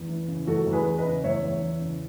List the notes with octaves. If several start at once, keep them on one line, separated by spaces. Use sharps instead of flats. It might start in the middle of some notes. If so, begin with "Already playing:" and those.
Already playing: E2
E3
C#3
E2 F#4 A4
E2
G#4 B4
E3
B4 D#5
C#3
E2 C#5 E5
E2
E3
C#3